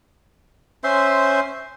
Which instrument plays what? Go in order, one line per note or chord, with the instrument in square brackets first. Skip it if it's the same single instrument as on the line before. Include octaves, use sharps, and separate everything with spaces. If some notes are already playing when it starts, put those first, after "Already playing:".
[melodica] C#4 C5 E5 C6